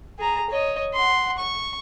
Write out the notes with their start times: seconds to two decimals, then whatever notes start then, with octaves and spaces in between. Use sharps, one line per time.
0.19 G#4 A#5
0.50 C#5 D#5
0.94 F#5 C6
1.38 C#6